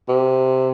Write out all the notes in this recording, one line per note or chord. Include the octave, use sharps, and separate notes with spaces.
C3